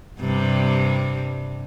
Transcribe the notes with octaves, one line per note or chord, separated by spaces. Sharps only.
G2 C3 G3